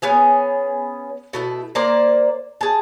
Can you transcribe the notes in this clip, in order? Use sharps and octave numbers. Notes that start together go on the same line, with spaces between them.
B3 C#4 G#4
B2 A3 E4
A#3 C5 D5 A#5
G#4 A5